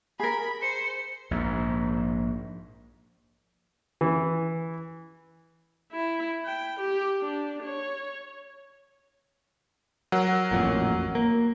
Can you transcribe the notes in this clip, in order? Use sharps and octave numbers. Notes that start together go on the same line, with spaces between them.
G#4 A#4 B5
C5 C#7
A#1 G#2
E3
E4
G5
G4
D4
C#5
F#3 A#4 F#5
A1 F2 A#2
A#3